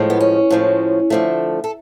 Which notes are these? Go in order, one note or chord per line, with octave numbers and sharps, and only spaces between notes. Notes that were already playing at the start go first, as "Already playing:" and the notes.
Already playing: A2 F3 G#3
B3
C#4
A2 F3 G#3
D3 F3 A3
A4